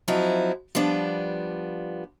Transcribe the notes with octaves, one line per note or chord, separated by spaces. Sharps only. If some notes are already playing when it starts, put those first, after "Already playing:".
F3 F#3 C4 D#4 E4
F3 G3 B3 D4